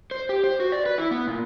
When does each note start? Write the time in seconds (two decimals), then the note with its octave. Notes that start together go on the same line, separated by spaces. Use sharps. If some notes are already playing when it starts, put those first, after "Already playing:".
0.11 C5
0.29 G4
0.44 C5
0.60 F#4
0.72 D5
0.86 B4
0.98 E4
1.11 B3
1.27 A#2